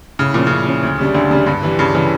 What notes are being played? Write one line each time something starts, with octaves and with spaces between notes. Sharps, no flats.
A2 C#3
A#2 F3 C#4
A2 C#3
F3 C#4
D2
C#3 G3 D4
D2 D3
C#3 G3 D4
G2
E3 G3
G2 C#3
C#3 E3 G3